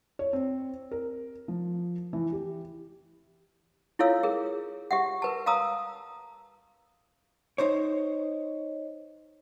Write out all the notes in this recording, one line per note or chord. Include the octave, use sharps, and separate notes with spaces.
C#5
C4
A#4
F3
E3
G4
E4 F4 A4 C#5 F5 E6
G#4 A#4
G4 E5 F#5
A#4 B4 A5
F5 A5 A#5 D#6 E6
D#4 C5 C#5